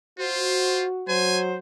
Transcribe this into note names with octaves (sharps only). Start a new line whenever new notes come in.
F4 F#4 C5
F#3 C5 G#5